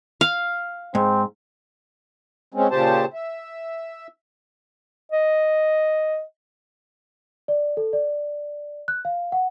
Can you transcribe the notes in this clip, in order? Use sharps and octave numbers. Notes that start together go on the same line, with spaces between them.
F5
G#2 C4
G#3 C4 C#4
A#2 C#3 G4 C5 A5
E5
D#5
D5
A4
D5
F#6
F5
F#5